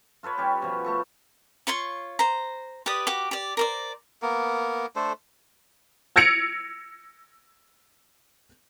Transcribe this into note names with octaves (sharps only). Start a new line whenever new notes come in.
F4 A4 B4 C#5
G3 C#4 G4
B2 F3
A3 A4 C#6
F4 C#5 C6 C#6
C5 A#5
G4 B4 D5 D#6
F#4 G4 D6
G4 D5
A#4 C5 D5
A#3 B3 A#4
A3 D4 A4 C5
E6 G#6 A#6 C#7 D7 F7